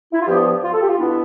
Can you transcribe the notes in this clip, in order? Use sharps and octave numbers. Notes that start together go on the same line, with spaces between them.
E4
F4
G2 F3 B3 G4
F4
A4
G4
F4
B2 B3 D4 E4